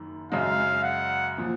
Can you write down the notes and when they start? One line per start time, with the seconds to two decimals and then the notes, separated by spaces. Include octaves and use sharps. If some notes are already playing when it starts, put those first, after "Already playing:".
Already playing: F#1 F#2 D#3
0.32 F#2 C#3 G#3 F5
0.83 F#5
1.38 A#2 F3